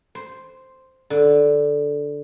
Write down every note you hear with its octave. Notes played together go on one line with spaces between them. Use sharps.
C5
D3